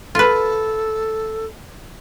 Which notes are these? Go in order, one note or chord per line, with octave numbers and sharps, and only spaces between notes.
F4 A4 B4